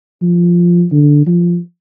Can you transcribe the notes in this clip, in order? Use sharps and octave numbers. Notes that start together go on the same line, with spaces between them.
F3
D3
F3